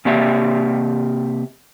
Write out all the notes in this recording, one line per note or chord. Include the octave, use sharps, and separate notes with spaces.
C3 A#3 G4 D5 E5